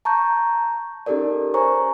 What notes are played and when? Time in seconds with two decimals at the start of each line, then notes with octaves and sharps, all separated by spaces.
0.05 A5 A#5 C#6 G6
1.06 C#4 D#4 G4 A4 A#4 D5
1.54 C5 C#5 G#5 A#5 C#6